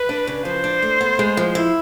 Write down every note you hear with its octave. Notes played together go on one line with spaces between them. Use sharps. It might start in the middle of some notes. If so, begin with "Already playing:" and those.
Already playing: B4
D4
C#3
F3 C5
D4
A3
B3
G#3
F3
E4